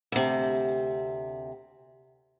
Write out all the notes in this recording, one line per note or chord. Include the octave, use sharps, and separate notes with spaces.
D2 C3